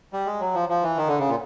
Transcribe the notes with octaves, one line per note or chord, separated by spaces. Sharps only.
G3
G#3
F#3
F3
F3
E3
D#3
D3
C#3
A#2